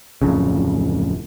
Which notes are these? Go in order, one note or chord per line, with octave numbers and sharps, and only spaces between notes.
D1 F2 C#3